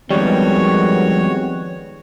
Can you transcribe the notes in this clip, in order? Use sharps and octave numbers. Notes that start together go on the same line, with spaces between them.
F2 D#3 G3 G#3 B3 F#4 C#5